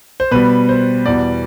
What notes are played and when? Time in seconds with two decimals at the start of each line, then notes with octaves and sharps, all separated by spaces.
0.20 C5
0.31 B2 G3 B4
0.69 C5
1.06 E2 B2 G3 D5